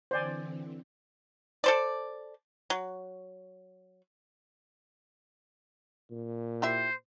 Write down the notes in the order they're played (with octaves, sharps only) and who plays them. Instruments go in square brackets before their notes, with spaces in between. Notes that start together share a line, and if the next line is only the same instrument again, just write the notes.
[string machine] D3 E3 C4 [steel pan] C5 D5 G#5
[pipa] A4 C5 D5
F#3
[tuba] A#2
[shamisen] E4 G4 E5 [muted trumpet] C5